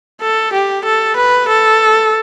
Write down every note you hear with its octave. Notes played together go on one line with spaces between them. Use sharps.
A4
G4
A4
B4
A4